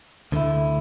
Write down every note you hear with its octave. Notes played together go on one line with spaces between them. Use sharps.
D2 D3 A3 E4